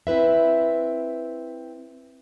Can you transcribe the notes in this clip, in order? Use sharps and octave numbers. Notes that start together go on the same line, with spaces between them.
C4 E4 B4 E5